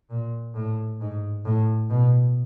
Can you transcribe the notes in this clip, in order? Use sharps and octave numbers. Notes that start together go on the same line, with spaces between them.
A#2
A2
G#2
A2
B2